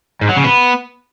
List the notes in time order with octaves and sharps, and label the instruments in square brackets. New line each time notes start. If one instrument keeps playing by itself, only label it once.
[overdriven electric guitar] G#2
F#3
C#3
B3